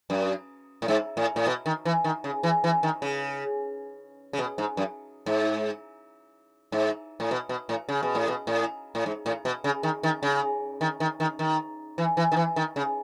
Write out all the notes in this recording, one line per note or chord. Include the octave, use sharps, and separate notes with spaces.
F#2
A2
G#2
A2
A2
B2
D#3
E3
D#3
C#3
E3
E3
D#3
C#3
C#3
B2
G#2
F#2
G#2
G#2
A2
B2
B2
A2
C#3
B2
A2
B2
A2
A2
G#2
A2
B2
C#3
D#3
D#3
C#3
D#3
D#3
D#3
D#3
E3
E3
D#3
E3
D#3
C#3